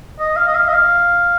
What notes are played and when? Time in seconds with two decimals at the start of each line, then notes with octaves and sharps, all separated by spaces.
0.19 D#5
0.37 F5
0.48 D#5
0.55 F5
0.69 D#5
0.73 F5